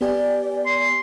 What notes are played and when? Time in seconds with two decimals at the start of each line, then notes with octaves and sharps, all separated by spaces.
0.01 B3 G4 D5 G#5
0.66 C6